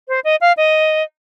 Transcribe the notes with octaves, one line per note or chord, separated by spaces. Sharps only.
C5
D#5
F5
D#5